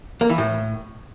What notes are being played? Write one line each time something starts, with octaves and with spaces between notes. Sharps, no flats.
A#3
E3
A2